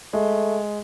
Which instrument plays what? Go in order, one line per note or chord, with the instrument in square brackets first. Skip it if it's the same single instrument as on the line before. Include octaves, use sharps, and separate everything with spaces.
[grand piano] G#3 [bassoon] A3